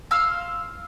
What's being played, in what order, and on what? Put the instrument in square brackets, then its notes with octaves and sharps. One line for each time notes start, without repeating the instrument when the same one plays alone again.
[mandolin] F5 C6 E6 F6